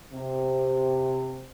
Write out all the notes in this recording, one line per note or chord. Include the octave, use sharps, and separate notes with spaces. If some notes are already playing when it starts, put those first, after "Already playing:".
C3